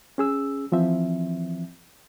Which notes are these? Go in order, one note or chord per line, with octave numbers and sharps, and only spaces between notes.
C#4 G#4 E6
E3 F3 C4 E5